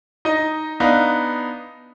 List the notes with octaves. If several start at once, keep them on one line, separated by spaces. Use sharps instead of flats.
D#4 D#5
B3 D4 D#4 F5